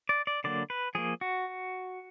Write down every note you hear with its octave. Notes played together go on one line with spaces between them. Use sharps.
D5
D5
D3 F#3 A#3 D5
B4
F3 A#3 G#4
F#4